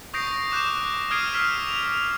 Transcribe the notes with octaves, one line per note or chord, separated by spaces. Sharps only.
C#6 D#6 G6 A#6 C7 D7
D6 F#6 G6 E7
D#6 F6 G#6 C7 D7 D#7
E6 F6 B6 E7
F7